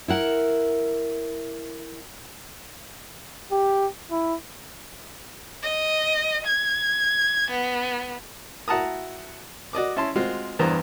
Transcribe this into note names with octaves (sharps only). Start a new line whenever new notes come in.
E4 A#4 F#5
G4
E4
D#5
G#6
B3
E4 F#4 F#5 A5 A#5 D#6
F#4 D5 D#5 D6
C#4 E4 A5 C6
G#3 C4 F4 F#4
E2 G2 E3 B3 C5 A#5